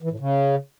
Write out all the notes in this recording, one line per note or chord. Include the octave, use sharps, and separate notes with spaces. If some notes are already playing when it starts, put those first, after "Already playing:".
E3
A2
C#3